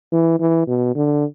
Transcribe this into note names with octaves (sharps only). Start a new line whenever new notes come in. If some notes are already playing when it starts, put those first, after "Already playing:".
E3
E3
B2
D3